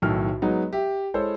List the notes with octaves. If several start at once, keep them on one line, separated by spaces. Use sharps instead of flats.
B1 A2 D#3 F6
F#3 G#3 B3 D#4
G4 E5
G#3 E4 A4 C5 C#5